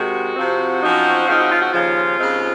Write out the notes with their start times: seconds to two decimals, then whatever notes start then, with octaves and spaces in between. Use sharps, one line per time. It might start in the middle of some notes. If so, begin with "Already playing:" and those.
Already playing: C3 D#3 G#3 F#4
0.36 C3 F3 C4
0.82 F#2 F3 C4 D#4
1.27 C#3 F3 C4 D#4 F4
1.39 F#4
1.51 F4
1.61 F#4
1.73 D#2 C#3 F3 F4
2.19 D#2 C#3 F3 G#3 C4